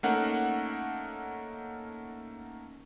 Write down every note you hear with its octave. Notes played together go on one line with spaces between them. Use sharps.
A3 A#3 C#4 D#4 A#4 F#5